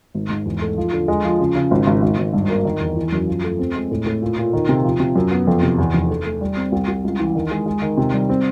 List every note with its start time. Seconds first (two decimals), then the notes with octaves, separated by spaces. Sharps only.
0.15 G#1
0.30 G#2
0.46 E2
0.62 A3
0.77 F3
0.93 D3
1.08 G#3
1.24 F3
1.40 C#3
1.56 C#3
1.71 G#1
1.87 G#1
2.02 G#1
2.18 G#1
2.33 G2
2.50 A#3
2.65 D#3
2.80 E2
2.96 E3
3.12 F#2
3.27 F3
3.44 A3
3.59 C4
3.75 G#3
3.91 A2
4.06 A2
4.22 A#2
4.38 A#2
4.53 D#3
4.69 C3
4.84 F3
5.00 C3
5.15 F#2
5.31 B3
5.47 F2
5.63 C3
5.78 E2
5.94 F1
6.10 A3
6.25 A3
6.41 G3
6.57 C4
6.72 C2
6.88 C2
7.04 C#2
7.20 E3
7.35 D#3
7.51 G#3
7.66 G#3
7.82 D#3
7.98 C3
8.13 G3
8.29 C4